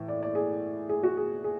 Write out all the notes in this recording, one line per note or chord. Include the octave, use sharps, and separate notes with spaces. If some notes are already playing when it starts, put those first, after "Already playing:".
Already playing: A2 E3
D5
D5
G#4
G#4
F#4
G#4
G#4